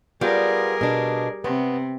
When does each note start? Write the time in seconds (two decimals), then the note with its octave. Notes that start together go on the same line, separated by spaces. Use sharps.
0.21 G3 B3 F4 G#4 A#4
0.81 B2 D4
1.44 C3 B3